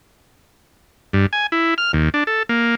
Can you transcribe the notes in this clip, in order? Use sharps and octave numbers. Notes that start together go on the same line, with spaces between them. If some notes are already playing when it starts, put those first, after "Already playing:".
G2
G#5
E4
F6
D#2
D4
A4
A#3